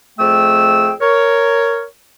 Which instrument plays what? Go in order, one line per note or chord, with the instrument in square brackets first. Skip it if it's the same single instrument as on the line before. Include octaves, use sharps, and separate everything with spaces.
[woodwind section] F2 A3 G#4 G5 E6
A#4 C#5